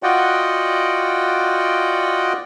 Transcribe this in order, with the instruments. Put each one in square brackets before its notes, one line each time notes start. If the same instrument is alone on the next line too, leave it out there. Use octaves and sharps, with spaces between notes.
[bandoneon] F4 F#4 D5 D#5 F#5 G5